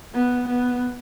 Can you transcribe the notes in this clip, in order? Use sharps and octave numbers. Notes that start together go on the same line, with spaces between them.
B3
B3